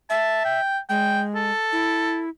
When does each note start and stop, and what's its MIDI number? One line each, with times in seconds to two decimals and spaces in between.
0.10 0.60 76
0.10 0.43 81
0.45 0.78 79
0.89 1.51 56
0.89 1.21 79
1.35 2.21 69
1.72 2.29 64